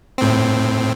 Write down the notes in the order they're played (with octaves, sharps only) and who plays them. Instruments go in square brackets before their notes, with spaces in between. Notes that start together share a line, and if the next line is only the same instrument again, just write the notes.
[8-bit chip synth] A2 C4